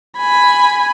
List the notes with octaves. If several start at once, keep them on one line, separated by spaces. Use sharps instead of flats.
G#5 B5